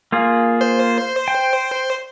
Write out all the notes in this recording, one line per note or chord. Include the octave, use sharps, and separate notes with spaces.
A#3 F4 G#4
C5
G5